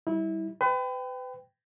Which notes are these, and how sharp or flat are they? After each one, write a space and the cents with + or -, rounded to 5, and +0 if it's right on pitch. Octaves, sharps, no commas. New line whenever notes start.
G3 -10 E4 -25
B4 +35 G5 +0